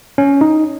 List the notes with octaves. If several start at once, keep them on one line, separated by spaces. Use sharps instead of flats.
C#4
D#4